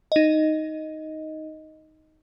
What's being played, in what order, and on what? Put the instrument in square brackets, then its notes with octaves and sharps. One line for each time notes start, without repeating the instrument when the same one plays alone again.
[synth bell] D#4 D#5